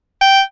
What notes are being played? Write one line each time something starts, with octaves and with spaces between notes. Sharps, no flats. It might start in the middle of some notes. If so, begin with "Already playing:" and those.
G5